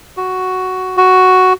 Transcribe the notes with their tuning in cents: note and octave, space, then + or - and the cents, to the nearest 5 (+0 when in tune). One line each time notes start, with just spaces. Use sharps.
F#4 +5
F#4 +5